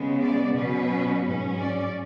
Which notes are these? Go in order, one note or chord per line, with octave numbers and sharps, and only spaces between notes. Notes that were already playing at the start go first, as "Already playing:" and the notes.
Already playing: C#3 G#3 B3
D5
B2 F#3 C#4 B4
G#2 F#3 C#4
D5